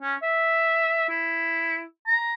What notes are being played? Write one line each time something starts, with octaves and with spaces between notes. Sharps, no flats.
C#4
E5
E4
A#5